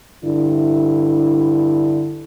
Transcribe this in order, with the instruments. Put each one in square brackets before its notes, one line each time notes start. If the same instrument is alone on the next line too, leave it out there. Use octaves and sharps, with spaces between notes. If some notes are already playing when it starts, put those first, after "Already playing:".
[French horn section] G2 D3 E4